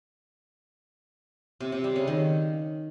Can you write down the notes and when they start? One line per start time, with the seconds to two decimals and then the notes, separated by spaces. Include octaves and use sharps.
1.61 C3
1.72 C3
1.84 G3
1.96 C#3
2.07 D#3